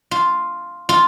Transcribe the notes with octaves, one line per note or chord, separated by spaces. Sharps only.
F4
F4